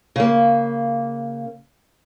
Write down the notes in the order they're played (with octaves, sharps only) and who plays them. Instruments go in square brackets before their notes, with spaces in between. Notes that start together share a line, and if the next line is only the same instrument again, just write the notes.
[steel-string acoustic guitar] C#3 A#3